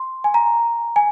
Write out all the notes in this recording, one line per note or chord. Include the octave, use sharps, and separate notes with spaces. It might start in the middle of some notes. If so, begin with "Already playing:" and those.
Already playing: C6
G#5
A#5
G#5